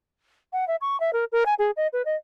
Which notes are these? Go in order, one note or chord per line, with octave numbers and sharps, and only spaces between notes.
F#5
E5
C#6
E5
A#4
A#4
G#5
G#4
D#5
B4
D#5